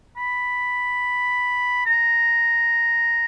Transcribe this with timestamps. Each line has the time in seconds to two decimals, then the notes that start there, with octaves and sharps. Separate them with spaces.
0.17 B5
1.86 A#5